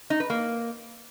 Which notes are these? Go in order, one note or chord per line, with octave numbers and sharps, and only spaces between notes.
D#4
B4
A#3